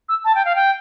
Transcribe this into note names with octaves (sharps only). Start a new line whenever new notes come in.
E6
A5
G5
F5
G5